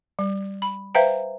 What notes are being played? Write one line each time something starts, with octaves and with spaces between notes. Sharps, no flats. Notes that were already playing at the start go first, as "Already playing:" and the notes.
G3
B5
B4 C5 E5 F5 G5 A#5